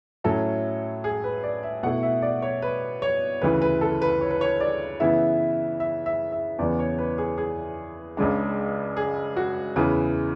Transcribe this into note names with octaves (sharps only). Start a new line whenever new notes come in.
A2 F#3 C#4 E4 A4
G#4
B4
D5
E5
B2 A3 E4 F#5
E5
D5
C#5
B4
C#5
D2 C#3 E3 B4
B4
A4
B4
C#5
B4
C#5
D5
C#3 E3 B3 E4 E5
E5
E5
E5
E2 C#3 E3 B3 D5
C#5
B4
G#4
G#4
C#2 C#3 G#3 D4
G#4
F#4
E2 C#3 E3 B4